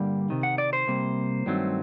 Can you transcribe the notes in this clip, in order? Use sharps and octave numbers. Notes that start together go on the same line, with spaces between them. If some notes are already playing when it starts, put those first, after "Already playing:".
Already playing: G2 D3 G3 A#3
C3 D#3
F#5
D5
C5
C3 G3 A#3
G2 D#3 F#3 A3 C4